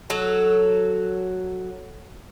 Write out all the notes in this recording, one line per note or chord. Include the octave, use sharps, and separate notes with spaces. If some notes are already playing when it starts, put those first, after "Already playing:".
F#3 A4